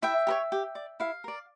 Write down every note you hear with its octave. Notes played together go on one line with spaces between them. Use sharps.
E4 E5 G5
G4 A#4 C#5
G4
D5
E4 F5
A#4 D5